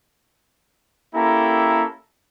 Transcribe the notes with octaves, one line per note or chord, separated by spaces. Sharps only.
A#3 C#4 E4 G4 A4 A#5